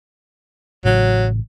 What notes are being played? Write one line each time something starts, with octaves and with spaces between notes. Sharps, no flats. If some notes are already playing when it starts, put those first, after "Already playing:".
A1 A2 C#3 F#3